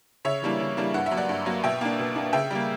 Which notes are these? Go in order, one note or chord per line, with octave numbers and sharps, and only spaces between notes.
C#3 C#5 E5
E3 G3 A#3 D4
C#3
E3 G3 A#3 D4
G2 F#5
E5
F#3 A#3
D5 F#5
G2
F#3 A#3
B2 E5 G5
A#3 D4
B2
A#3 D4
C#3 E5 G5
G3 A#3